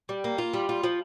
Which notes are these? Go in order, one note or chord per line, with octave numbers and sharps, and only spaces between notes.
G3
A#3
F4
G3
F4
F3